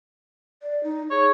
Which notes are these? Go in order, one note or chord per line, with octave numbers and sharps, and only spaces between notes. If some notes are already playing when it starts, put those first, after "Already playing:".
D5
D#4
G#4 C#5